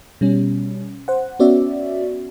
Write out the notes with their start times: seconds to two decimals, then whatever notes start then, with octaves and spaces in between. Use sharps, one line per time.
0.21 B2 G3 C#4
1.08 C5 F#5
1.39 B3 C#4 F#4 D5 E5